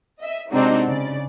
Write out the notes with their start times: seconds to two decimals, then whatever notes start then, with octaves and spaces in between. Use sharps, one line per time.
0.19 D#5 E5
0.50 C3 G#3 C4 D4 D#4 F#4
0.87 C#3 D5